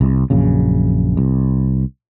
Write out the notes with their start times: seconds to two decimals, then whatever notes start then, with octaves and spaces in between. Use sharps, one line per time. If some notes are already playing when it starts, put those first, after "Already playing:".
0.01 C2
0.30 A#1 F#2 C#3
1.17 C2